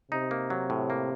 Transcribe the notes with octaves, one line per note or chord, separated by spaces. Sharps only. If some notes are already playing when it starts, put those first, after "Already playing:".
C3 D#4
A#3
F#3
A2
A#3